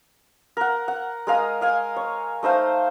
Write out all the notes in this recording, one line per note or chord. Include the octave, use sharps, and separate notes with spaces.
A#4 F#5
F#5
G#3 A#4 F5 D#6
D#5 F5 G#5
C#5
A3 D#4 C5 F5